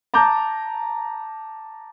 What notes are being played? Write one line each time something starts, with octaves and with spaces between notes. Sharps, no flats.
A5 A#5 D6 G6